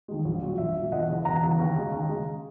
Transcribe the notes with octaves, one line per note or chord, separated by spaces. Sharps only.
D#2 D#3 G#3
A#1
A#2 F#3
A#1 E5
A#2 F#3
E1 D#5 F#5
E2 C#3 E3
E1 F#5 A#5
E2 C#3 E3
D#2
C#3 G#3
D#2
C#3 G#3